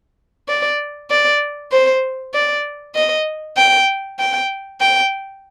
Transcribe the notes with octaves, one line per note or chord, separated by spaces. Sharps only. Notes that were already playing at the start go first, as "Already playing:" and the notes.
D5
D5
C5
D5
D#5
G5
G5
G5